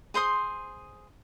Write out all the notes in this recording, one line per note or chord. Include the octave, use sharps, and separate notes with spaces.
G#4 C5 C6 D#6